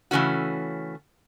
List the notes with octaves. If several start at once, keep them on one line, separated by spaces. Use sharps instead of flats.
C#3 E3 A3 C#4 F#4